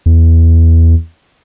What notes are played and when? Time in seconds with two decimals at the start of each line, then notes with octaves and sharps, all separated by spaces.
0.06 E2